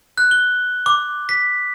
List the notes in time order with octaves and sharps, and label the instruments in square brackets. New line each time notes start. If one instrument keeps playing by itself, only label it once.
[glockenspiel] F#6
G7
D6
B6